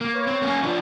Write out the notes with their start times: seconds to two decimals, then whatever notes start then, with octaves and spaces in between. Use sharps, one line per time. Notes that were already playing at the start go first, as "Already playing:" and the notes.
0.01 A#3
0.15 B4 C#5
0.27 C4
0.42 A#3 C#4
0.63 F3 D4